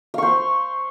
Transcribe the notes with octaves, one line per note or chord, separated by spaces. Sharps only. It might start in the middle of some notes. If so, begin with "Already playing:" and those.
C5 F5 C#6